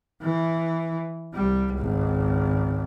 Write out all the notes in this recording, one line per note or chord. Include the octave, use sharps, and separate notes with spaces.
E3
C2 G3
G#1 C#2